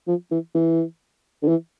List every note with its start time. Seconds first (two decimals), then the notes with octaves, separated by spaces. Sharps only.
0.08 F3
0.31 E3
0.55 E3
1.43 D3
1.48 E3